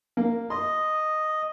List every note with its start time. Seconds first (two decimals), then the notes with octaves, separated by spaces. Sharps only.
0.17 A#3
0.50 D#5 C6